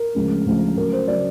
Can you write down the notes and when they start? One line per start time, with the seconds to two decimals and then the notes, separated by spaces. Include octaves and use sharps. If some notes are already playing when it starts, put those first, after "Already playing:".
Already playing: A#4
0.15 D2 C#3 F3 G#3
0.46 D2 C#3 F3 G#3
0.76 D2 C#3 F#3 A#4
0.93 C5
1.08 C#3 F#3 D5